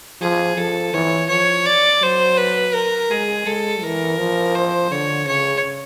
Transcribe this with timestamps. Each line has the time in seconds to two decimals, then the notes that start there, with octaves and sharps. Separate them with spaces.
0.21 F3 G#4
0.57 F3 A4
0.93 E3 C#5
1.29 F3 C#5
1.66 D5
2.02 F#3 C5
2.37 B4
2.74 A#4
3.10 G#3 G#4
3.46 G#3 A4
3.82 E3 A#4
4.19 F3
4.55 C5
4.91 D3 C#5
5.27 C#3 C#5